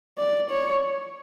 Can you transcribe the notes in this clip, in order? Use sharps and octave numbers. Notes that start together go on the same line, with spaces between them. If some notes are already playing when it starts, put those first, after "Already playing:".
D5
C#5